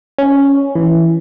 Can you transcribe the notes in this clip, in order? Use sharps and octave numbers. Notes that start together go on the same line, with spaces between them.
C#4
E3